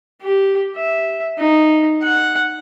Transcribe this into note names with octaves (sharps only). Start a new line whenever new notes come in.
G4
E5
D#4
F#5